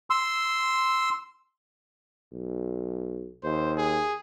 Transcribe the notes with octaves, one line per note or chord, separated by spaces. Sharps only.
C6 E6
B1
D#2 C5
G#4